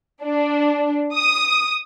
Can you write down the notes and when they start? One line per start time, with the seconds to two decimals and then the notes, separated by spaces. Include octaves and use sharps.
0.23 D4
1.14 D#6